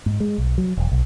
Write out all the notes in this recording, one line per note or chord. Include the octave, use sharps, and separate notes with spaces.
G#2
G#3
B1
F#3
E1
B1